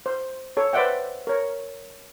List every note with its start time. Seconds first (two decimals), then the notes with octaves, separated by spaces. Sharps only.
0.06 C5
0.57 A4 C#5
0.73 B4 C5 D5 E5 F#5 G5
1.27 A#4 C#5